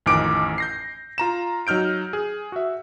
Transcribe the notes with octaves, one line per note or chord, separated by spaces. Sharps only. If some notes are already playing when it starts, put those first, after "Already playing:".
A1 F2 D#3 G#5 D6 D7
G6 A#6 C7
F4 A#5 E7
F#3 D#4 F6 G6 D7
G#4
F#4 E5